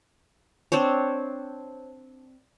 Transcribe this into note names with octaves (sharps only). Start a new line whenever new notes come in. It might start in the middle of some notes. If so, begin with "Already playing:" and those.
C4 D4 C5 C#5